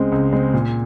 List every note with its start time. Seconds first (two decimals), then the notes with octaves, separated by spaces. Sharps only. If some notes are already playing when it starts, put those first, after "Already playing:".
Already playing: C#2 C#3 G#3 C4
0.12 C#2
0.33 C#3 G#3 C4
0.54 A#2